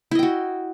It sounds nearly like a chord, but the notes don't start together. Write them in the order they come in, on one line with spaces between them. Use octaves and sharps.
E4 D#5 G5 F#4